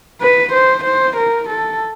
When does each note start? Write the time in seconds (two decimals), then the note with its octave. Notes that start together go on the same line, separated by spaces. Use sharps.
0.22 B4
0.53 C5
0.85 C5
1.17 A#4
1.50 A4